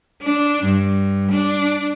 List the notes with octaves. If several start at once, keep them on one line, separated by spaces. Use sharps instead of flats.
D4
G2
D4